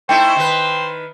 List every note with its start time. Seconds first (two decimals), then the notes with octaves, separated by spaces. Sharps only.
0.09 A3 D#4 E4 C5 G5
0.36 D#3 B4